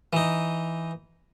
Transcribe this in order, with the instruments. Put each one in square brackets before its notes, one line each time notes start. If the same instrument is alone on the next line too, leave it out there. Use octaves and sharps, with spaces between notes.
[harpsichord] E3 D#4